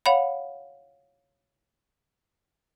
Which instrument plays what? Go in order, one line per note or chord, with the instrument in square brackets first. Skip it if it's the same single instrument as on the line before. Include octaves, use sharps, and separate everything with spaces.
[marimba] C#5 F5 F#5 B5